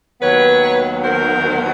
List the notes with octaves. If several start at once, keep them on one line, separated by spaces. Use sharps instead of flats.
D#2 D#3 F#3 B3 B4 C#5
A#4 C5